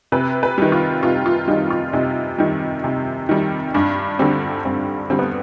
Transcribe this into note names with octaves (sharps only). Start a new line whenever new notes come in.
C3 B4
B4
D#3 G3
F4
C3 F4
F4
D#3 G3 D#4
F4
C3 D#4
D#3 G3
C3
D#3 G3
G2 D4
D3 G3 C4
G2 C4
D3 G3 C4
B3